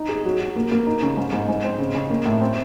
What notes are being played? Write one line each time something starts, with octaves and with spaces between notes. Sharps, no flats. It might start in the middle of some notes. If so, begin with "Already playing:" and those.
Already playing: D#4
G#4
F#3
F#3
A#3
A#3
D#4
C#3
G#2
G#2
G#2
C4
C#3
C#3
A#3
A2
C4